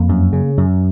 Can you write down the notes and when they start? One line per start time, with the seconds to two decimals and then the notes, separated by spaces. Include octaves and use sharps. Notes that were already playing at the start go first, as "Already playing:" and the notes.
Already playing: F2 A#3
0.09 F#2
0.33 C#3
0.57 F#2